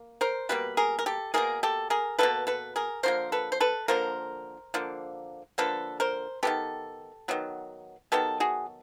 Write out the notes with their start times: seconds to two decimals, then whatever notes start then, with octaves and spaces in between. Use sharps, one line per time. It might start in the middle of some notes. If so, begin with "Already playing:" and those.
Already playing: A#3
0.21 A#4 C5
0.49 B2 G3 A#3 B4
0.77 G#4 A#4
0.99 A#4
1.06 G4 A4
1.34 B2 G3 A#3 G#4 A#4
1.63 G4 A4
1.90 G#4 A#4
2.18 G3 A#3 A4 B4
2.23 B2
2.47 A4 B4
2.76 G#4 A#4
3.03 D3 F3 A#3 A#4 C5
3.32 A4 B4
3.52 C5
3.60 A4 B4
3.88 D3 F3 A#3 A#4 C5
4.74 D3 F3 A#3
5.58 D3 F3 A#3 A4 B4
6.00 A#4 C5
6.43 D#3 F#3 B3 G4 A4
7.28 D#3 F#3 B3
8.12 D#3 F#3 B3 G4 A4
8.40 F#4 G#4